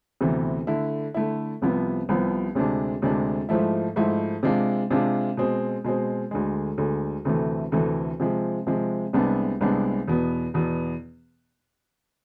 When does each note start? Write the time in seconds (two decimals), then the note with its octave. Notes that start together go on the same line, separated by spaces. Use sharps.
0.21 D2 C3 E3 B3
0.67 D3 A3 E4
1.14 D3 A3 E4
1.62 C2 C3 F3 B3
2.09 C2 C3 F3 B3
2.55 D2 C3 G#3 D4
3.02 D2 C3 G#3 D4
3.49 G#2 F3 A3 E4
3.96 G#2 F3 A3 E4
4.43 C3 G#3 D4 F4
4.91 C3 G#3 D4 F4
5.37 B2 G#3 C4
5.84 B2 G#3 C4
6.31 D2 D3 G#3
6.78 D2 D3 G#3
7.25 D2 C3 E3 A3
7.72 D2 C3 E3 A3
8.20 C3 F3 G#3
8.67 C3 F3 G#3
9.13 C2 C3 G#3 B3 D4
9.61 C2 C3 G#3 B3 D4
10.08 E2 B2 B3
10.54 E2 B2 B3